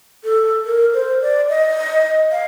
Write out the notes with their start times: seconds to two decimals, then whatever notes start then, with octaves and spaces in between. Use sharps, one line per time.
0.24 A4
0.65 A#4
0.94 C5
1.21 D5
1.49 D#5
2.31 F5